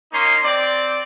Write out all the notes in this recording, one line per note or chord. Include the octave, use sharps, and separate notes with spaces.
A#3 C#4 D#4 C6
C4 D5